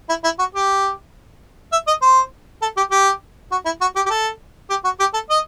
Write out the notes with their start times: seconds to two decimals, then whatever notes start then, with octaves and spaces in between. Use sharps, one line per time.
0.09 E4
0.24 E4
0.39 F#4
0.55 G4
1.72 E5
1.87 D#5
2.02 C5
2.62 A4
2.77 G4
2.91 G4
3.51 F#4
3.65 E4
3.81 F#4
3.96 G4
4.06 G4
4.10 A4
4.70 G4
4.84 F#4
4.99 G4
5.14 A4
5.30 D#5